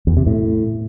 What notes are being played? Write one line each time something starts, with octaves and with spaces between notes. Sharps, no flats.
E2
C3
A2